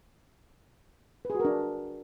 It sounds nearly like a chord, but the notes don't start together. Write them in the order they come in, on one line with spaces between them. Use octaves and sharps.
B4 G#4 F#4 A#4 D4